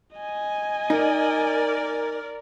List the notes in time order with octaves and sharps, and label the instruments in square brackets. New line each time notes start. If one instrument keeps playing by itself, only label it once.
[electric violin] D#5 G#5
[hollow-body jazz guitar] D#4 [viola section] A#4 D5